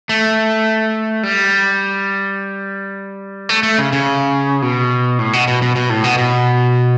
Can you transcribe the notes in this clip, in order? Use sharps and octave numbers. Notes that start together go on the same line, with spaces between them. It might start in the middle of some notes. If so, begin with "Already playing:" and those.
A3
G3
A3
A3
C#3
C#3
B2
A2
B2
B2
B2
B2
A2
B2
B2